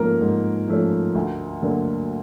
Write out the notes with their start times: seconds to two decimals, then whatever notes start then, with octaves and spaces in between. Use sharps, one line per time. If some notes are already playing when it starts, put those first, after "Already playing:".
Already playing: G#2 F3 A3 A#3 C#4 A#4
0.21 G#2
0.68 F3 A3 C#4
1.15 D2
1.62 D3 F#3 A#3